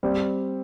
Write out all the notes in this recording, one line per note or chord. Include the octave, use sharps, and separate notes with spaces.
G3 C4